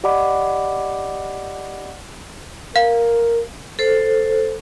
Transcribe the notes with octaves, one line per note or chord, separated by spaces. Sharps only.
G4 D5 D#5 F#5 B5 D6
A#4 F5
A4 C5